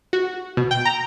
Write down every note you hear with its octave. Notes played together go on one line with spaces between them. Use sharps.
F#4
B2
G5
A#5